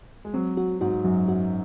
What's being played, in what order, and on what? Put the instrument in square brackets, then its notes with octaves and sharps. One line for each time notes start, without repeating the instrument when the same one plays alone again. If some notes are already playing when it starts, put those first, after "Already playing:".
[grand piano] G#3
[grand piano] F#3 [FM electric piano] C4
[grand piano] F#3 [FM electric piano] F#4
[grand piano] G#2 [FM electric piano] F#4
[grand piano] F#2 [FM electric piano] F#3
[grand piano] F#2 [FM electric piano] F#4